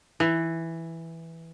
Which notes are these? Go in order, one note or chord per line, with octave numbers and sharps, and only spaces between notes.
E3